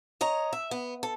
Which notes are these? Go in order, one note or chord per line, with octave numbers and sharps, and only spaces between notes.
C#5 D#5 A#5
E5
B3
A4